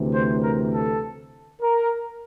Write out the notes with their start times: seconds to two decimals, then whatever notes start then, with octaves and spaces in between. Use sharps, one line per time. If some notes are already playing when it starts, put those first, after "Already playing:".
Already playing: D2 C3 E3
0.13 C5
0.43 A#4
0.72 A4
1.62 A#4